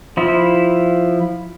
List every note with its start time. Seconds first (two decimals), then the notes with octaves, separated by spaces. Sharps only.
0.17 F3 E4